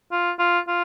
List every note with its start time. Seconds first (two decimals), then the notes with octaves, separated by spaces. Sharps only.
0.11 F4
0.39 F4
0.68 F4